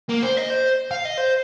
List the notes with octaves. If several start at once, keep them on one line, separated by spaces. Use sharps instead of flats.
A#3
C5
D#5
C5
F5
D#5
C5